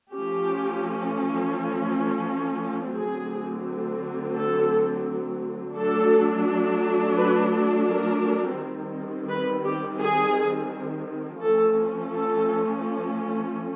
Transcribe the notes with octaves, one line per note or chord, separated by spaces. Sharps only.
F3 A3 C#4 G4
D3 F#3 A3 C4 G#4
A4
F#3 A3 D4 A4
B4
A#4
D#3 G3 C4
B4
G4
G#4
F3 A3 C#4 A4
A4